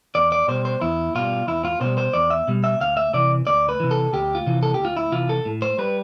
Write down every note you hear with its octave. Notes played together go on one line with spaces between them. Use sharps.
E2 D5
D5
B2 G3 C5
C5
E2 E4
B2 G3 F4
E2 E4
F4
B2 G3 C5
C5
E2 D5
E5
B2 G3
E5
D2 F5
E5
C3 E3 D5
D2 D5
B4
C3 E3
A4
D2 G4
F4
C3 E3
A4
D2 G4
F4
E4
C3 E3 F4
A4
A2
C5
G3 B4